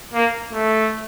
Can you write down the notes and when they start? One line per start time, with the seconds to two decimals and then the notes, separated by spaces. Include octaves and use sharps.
0.13 A#3
0.53 A3